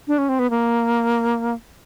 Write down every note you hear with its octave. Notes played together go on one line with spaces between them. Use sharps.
D4
C#4
C4
B3
A#3